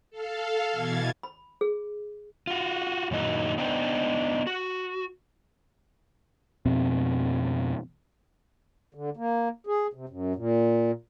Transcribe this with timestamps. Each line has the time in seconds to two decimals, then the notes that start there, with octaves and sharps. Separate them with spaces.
0.11 A4 F5
0.71 B2 E3 G#6 A6
1.23 B5
1.61 G#4
2.47 F4 F#4
3.11 F#2 A#2 D#3 D#4 E4 F#4
3.58 B3 D4 D#4 C5 G5
4.47 F#4
6.66 F2 B2 C4
8.95 D3
9.17 A#3
9.67 G#4
9.93 C3
10.09 F#2
10.36 A#2